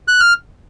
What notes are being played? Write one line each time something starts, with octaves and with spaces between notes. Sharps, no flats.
F#6
F6